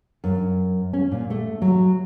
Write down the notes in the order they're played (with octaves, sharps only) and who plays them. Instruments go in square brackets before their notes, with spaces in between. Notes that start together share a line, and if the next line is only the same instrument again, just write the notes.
[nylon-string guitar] F#2
C#4
A#2
A3
F#3